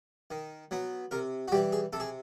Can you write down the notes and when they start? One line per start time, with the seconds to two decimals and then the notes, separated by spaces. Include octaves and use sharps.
0.31 D#3
0.71 F#3 B3
1.11 C3 A#4
1.48 F#4
1.52 E3 G3 G4
1.72 G#4
1.93 C3 A4
2.00 G#4